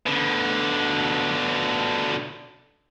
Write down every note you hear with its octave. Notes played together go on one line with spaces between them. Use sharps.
B2 D3